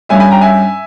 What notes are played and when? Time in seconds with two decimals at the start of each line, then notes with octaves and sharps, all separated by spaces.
0.09 G2 G3 C#4 E5 G#5
0.20 G#5 B5
0.31 G5 A#5
0.41 E5 G#5